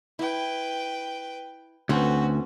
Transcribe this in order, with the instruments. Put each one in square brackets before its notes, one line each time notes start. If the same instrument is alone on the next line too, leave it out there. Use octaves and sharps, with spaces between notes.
[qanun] E4 [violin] B4 G5
[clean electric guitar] D2 [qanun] C4 C#4 A4 [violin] F#4 B4